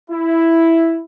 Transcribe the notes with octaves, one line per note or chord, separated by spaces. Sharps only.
E4